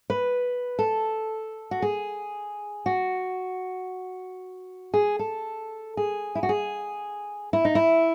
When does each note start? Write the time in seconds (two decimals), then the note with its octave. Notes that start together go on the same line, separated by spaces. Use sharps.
0.10 B4
0.79 A4
1.71 F#4
1.82 G#4
2.86 F#4
4.94 G#4
5.19 A4
5.97 G#4
6.35 E4
6.43 F#4
6.49 G#4
7.53 E4
7.65 D#4
7.75 E4